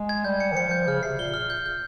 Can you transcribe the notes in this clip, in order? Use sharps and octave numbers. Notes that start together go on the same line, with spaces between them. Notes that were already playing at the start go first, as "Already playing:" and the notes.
Already playing: G#3
G#6
G3 G6
C#7
D#3
F3 C#7
G6
C#3 F6
C3 C7
A#2 G7
F6
G6
G6